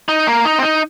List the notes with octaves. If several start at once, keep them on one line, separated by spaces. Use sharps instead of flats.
D#4
A#3
D#4
C4
D#4